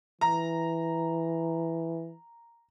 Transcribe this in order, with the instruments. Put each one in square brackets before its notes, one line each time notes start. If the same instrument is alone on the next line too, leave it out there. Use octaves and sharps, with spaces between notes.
[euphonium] E3 [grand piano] A#5